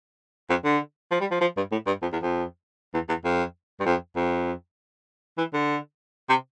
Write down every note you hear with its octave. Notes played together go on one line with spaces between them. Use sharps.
F2
D3
F3
G3
F3
F3
G2
A2
G2
F2
E2
F2
E2
E2
F2
G2
F2
F2
E3
D3
C3